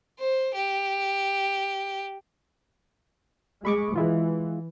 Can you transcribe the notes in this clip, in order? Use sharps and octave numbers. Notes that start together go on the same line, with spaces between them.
C5
G4
G#3 B5 C#6 D6
E3 G#3 E4 F4